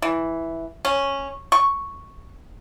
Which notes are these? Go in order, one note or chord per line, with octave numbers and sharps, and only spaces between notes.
E3
C#4
C#6